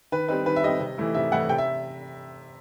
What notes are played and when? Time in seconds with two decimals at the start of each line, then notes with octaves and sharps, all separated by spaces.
0.12 D#3 B4
0.28 G3 C4 D#4 B4
0.46 D#3 B4
0.56 E5
0.64 G3 C4 D#4 D#5
0.80 C3
0.98 E3 A3 E4
1.14 C3 E5
1.32 E3 A3 E4 F#5
1.49 C3 G5
1.58 E5